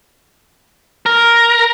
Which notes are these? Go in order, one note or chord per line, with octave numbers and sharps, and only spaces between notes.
A#4